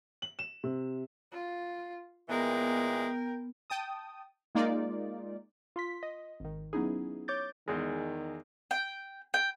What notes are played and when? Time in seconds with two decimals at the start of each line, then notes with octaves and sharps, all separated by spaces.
0.22 F#7
0.39 E7
0.64 C3
1.32 F4
2.29 A#2 E3 G#3 B3 A#4 G5
3.70 G5 A5 D#6
4.55 G#3 A#3 D#4 F4 D5
5.76 F4 C6 B6
6.03 D#5
6.40 G#1 D#3
6.73 F#3 B3 C#4 D#4 E4 G#4
7.28 C#5 D6 G6 A6
7.68 E2 D#3 G#3
8.71 G5
9.34 G5